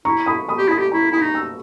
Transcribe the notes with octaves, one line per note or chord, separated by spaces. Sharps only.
E4 A#5 C#6
B5 D#6
B5 D#6
G4
E4 B5 D#6
G4
E4 A#5 C#6
E4 B5 D#6
D#4
C#6 E6